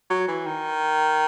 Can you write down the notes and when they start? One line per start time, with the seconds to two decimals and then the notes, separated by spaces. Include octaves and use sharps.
0.10 F#3
0.28 E3
0.46 D#3